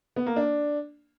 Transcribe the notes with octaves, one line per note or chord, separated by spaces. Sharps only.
B3
A#3
D4